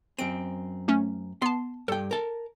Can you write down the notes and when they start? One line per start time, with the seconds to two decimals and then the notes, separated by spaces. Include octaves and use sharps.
0.19 F#2 C4 D7
0.88 A3 C#4
1.42 B3 A5 C6
1.88 G2 A4 G5
2.11 A#4 A5